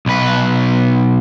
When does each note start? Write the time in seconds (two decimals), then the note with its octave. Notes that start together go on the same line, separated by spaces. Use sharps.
0.06 B1 B4